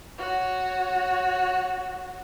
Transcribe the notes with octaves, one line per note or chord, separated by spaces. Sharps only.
F#4 C#5